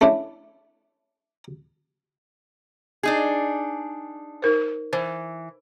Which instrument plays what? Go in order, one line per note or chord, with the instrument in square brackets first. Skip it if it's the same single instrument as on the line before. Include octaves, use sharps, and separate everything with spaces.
[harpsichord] A3 C#4 D4 E4
[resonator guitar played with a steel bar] D4 D#4 G#4
[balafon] D#4 A#4 C5
[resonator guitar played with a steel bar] E3 [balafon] C5